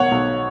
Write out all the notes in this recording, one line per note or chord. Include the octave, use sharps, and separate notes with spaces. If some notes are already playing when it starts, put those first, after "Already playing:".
Already playing: B1 B2 C#5 F#5
B1